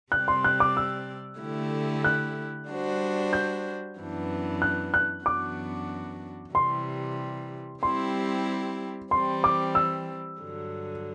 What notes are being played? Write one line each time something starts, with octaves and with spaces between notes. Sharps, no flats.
C3 G3 C4 G4 D5 F#6
C6
F#6
D6
E6
D3 A3 E4 G4
F#6
G3 D4 F#4 C5
G6
F#2 E3 B3 D4
F#6
F#6
F#2 E3 B3 D4 F#4 D6
C3 E3 G3 C6
G3 C4 E4 G4 C6
E3 G3 C4 C6
D6
E6
G2 D3 F#3